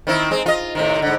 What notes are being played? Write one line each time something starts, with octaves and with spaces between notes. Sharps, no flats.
D#3 C4 E4
G#3 C4
F4 D#5
A2 C3 D#3
G#2 D3